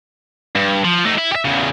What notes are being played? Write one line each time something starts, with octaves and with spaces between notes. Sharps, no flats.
G2
F3
A3 D#4
E4
G4 E5
E2 C#3